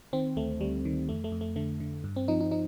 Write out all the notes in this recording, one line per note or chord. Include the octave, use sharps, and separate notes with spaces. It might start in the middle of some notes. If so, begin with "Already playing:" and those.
D#3 C4
D2 A3
D2 G3
D#3
F2 A3
A3
F2
A3
D3 A3
D3
G2
C4
F3 D#4
D#4
F3 D#4